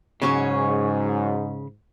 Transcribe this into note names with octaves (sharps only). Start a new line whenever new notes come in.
G#2 C#3 F#3 C#4 C#5